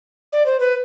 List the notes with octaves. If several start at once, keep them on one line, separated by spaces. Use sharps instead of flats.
D5
C5
B4